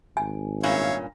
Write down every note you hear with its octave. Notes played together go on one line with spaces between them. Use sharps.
G#1 G#5
G2 A#2 C#4 C#5 E5 F5